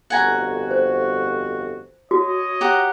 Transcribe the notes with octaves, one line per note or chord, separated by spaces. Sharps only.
G1 F2 F#4 F#5 G#5 A#5
C5
F#4 C#5 D#5
G4 F#5 A#5